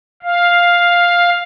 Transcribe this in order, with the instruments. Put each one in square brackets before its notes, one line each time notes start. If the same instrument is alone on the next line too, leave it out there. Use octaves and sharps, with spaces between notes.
[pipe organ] F5